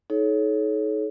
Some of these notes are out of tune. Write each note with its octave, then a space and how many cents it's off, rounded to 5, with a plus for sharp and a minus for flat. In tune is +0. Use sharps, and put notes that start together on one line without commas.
D#4 +30 A4 -40 C#5 +0